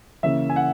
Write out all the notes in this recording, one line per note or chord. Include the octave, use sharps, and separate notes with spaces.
C#3 E3 A#3 C#4 E5
G#5
F#5